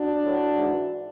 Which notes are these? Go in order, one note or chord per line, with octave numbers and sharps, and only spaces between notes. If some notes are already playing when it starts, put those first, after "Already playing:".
Already playing: D4 F#4
A2 F#3
G#2 E3